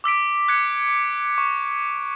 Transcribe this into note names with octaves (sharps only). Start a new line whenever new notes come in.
D6 E6 B6 D7
F#6 G#6 C#7
D6
C#6